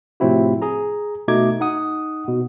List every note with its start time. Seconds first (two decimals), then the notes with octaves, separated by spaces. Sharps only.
0.20 A2 C3 F3 C4 E4 F#4
0.62 G#4 A#5
1.28 B2 A3 D#4 F#4 D6 G#6
1.60 D#4 F#5 D#6
2.28 B2